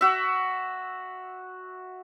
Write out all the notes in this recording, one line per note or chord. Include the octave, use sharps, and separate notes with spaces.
F#4 E5